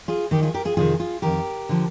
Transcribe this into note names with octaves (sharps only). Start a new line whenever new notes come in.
F4 G#4
D#2 D#3 D#4 G4
F4 G#4
G4 A#4
F4 G#4
F2 C3 D#3 F4 G#4
F4 G#4
F2 D#3 G4 A#4
D3 F3